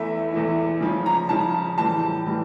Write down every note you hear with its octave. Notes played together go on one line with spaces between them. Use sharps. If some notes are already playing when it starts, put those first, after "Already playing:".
Already playing: E2 E3 A3 E4 E5
E2 E3 A3 E4
C#3 F3 C#4
A#5
C#3 F3 C#4 A5
A2 E3 G3 A5
A2 E3 G3